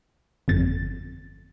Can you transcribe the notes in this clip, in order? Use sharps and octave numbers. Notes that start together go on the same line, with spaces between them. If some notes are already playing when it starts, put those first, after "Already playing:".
G1 F2 A6